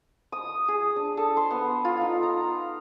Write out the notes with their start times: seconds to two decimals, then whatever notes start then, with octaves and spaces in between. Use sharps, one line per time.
0.32 D#6
0.68 G#4
0.96 D4
1.17 A4
1.37 C6
1.51 B3
1.85 F4
2.01 D#4
2.23 A#5